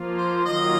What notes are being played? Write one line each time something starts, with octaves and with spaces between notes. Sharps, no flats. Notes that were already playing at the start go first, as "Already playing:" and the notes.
Already playing: F3 A#3 F4
C5
D#3 F#3 A#3 F4 D#5